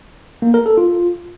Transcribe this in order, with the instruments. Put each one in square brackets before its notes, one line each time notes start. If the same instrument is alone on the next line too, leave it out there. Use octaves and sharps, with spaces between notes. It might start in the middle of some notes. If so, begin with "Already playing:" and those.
[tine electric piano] A#3
A#4
A4
F4